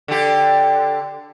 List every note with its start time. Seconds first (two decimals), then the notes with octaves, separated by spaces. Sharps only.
0.08 D3 G4